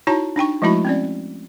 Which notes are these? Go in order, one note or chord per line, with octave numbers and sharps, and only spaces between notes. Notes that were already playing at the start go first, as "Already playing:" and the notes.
D#4 E4 F#4 C#5 A5 A#5
D4 D#4 G5 C#6
F3 G#3 A3 E4 F#4 B5
C4 C#4 D5